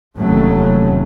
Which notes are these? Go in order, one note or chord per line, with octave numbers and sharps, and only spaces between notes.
F1 D#2 C#3 F#3 A3 C#4